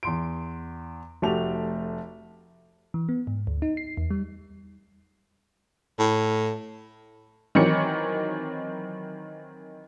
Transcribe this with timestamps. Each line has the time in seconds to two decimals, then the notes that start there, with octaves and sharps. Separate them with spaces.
0.03 E2 C6 D7
1.22 F1 A3 F#4 G4 A5 F7
2.94 E3
3.09 B3
3.27 G#2
3.47 D2
3.62 D#4
3.77 C7
3.97 E2
4.10 G3
5.99 A2
7.55 D#3 E3 F#3 C4 C#5 C#7